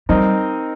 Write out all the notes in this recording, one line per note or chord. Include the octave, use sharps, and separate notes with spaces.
G3 C4 D#4 A#4 D#5